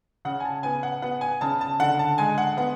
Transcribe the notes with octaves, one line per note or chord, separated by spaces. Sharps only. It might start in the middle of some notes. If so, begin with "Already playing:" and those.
C#3 F#5
G#5
A5
B3 G#5
F#5
B3 F#5
G#5
C#3 A5
A5
D3 F#5
A5
G#3 G#5
F#5
B3 F#5